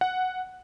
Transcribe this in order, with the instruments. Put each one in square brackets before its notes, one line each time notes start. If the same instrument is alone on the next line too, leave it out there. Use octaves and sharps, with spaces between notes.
[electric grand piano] F#5